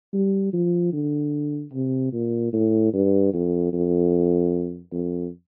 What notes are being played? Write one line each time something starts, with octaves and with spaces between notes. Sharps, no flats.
G3
F3
D3
C3
A#2
A2
G2
F2
F2
F2